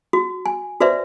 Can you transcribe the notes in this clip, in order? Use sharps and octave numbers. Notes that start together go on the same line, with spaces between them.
F#4
G#5
F#4 B4 C5 D5 E5